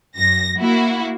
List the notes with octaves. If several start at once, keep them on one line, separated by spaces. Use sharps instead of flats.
F#2 A#6
A#3 E4 F#4